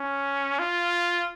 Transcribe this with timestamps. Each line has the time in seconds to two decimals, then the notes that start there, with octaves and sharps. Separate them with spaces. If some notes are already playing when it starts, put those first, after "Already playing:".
Already playing: C#4
0.59 F4